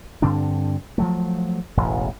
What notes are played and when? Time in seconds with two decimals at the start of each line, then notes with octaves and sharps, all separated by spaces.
0.22 G2 D3 C4 D4
0.98 F3 F#3 A3
1.77 E1 A1 A2